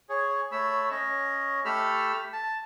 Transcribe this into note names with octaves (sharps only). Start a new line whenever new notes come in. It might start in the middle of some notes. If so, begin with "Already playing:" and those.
G#4 C#5
A3 C#5 B5 E6
C#4 C#5 D#5
A3 G4 A4 B5 E6 F6
A5